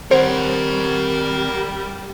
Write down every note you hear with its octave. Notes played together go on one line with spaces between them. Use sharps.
D#3 G3 C4 A#4 C5 F#5